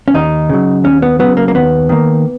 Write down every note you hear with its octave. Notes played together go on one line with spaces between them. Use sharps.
C#4
D#2 D#4
C#3 F#3
D#2 C#4
B3
C#3 F#3 B3
A#3
A#3
D#2 B3
D#3 A#3